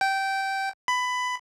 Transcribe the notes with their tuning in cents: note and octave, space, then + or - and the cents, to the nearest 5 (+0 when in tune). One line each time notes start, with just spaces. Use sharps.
G5 -15
B5 +15